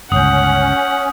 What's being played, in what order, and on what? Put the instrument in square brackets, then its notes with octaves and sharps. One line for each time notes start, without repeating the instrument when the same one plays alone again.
[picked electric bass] G1 C#2 [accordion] C#4 [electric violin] F#5 [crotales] D#6 G6